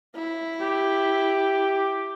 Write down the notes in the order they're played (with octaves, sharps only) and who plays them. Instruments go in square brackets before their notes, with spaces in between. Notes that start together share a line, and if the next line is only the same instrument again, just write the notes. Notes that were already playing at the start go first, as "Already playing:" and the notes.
[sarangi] E4
[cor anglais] G4